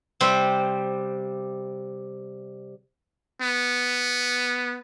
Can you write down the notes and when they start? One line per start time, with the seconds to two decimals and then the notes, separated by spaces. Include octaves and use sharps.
0.20 C3 G3 C5
3.41 B3